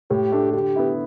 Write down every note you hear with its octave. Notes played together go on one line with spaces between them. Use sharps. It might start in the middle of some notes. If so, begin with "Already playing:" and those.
A2 G4
A3 D4
D3 G4
B3 E4